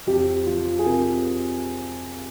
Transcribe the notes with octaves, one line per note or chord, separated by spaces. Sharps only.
F2 G4
F3 F4
G#4
C3 A#4